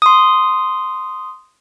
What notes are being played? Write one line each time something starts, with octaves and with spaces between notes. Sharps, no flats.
C6 D#6